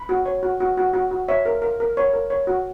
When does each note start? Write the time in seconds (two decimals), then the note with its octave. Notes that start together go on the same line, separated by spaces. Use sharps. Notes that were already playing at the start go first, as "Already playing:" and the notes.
Already playing: B5
0.09 F#4
0.26 C#5
0.43 F#4
0.60 F#4
0.77 F#4
0.94 F#4
1.11 F#4
1.28 C#5 E5
1.46 A#4
1.62 A#4
1.80 A#4
1.97 C#5
2.14 A#4
2.30 C#5
2.47 F#4